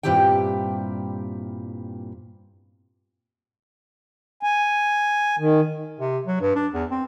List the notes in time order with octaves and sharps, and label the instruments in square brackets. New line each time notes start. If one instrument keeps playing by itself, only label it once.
[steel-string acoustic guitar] G2 A#2 C4 E4 G4 G5
[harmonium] G#5
D#3
[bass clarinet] C3
F#3
G2
D4
E2
C4